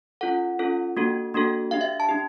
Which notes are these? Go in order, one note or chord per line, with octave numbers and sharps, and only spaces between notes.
C#4 F4 A4 F#5
C#4 F4 A4
A#3 D4 F#4 A4
A#3 D4 F#4 A4
D4 G4 F5
E5
A5
D4 G4